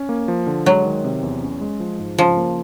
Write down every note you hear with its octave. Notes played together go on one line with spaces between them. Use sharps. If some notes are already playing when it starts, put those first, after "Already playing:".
Already playing: C#4
A#3
F3
D3
F#3 G#3
D#3
C3
E2
C#4
G#3
F3
G#2
C#3 F3
A#3